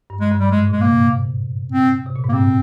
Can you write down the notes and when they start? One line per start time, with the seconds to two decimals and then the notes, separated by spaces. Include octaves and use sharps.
0.10 G2
0.20 G#3
0.31 G2
0.39 G3
0.51 G#2 G#3
0.67 A#2
0.72 G#3
0.81 C3 A#3
0.96 A#2
1.72 C4
2.06 C3
2.16 A#2
2.24 G#2
2.29 A#3
2.33 G2 C4